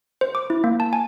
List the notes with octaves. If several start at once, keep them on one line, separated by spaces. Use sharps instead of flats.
C5
D6
E4
A#3
A5
G#5